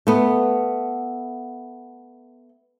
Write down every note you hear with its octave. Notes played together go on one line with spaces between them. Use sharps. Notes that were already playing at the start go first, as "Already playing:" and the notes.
A3 B3